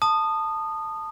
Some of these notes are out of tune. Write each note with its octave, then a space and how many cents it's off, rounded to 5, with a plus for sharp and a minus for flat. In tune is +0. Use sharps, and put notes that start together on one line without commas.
A5 +10 D#6 -20